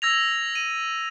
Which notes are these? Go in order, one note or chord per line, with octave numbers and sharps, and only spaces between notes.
E6 G#6 A#6 F7
D#7